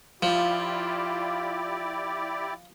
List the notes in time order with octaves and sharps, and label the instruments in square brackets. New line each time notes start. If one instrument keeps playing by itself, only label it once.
[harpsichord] F3 [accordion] E4 G4 D5 [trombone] F4